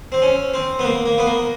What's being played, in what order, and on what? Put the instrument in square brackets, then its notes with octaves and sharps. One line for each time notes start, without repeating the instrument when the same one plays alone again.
[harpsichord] C4
C#4
C4
B3
A#3
A#3
B3
A#3